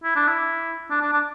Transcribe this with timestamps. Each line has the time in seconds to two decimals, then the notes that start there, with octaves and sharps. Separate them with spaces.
0.04 E4
0.16 D4
0.28 E4
0.90 D4
1.02 D4
1.13 D4